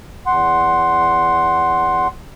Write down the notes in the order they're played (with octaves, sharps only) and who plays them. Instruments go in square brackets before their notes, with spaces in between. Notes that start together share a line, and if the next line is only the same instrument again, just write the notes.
[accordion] E2 F#5 C6